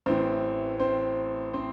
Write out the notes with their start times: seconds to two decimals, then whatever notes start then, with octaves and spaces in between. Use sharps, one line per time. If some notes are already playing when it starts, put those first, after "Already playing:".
0.06 A1 A2 E3 C4 C5
0.79 C4 C5
1.53 C4 C5